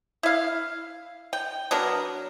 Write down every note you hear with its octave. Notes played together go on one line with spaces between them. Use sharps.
E4 F5
G5
F#3 B3 D4 A#4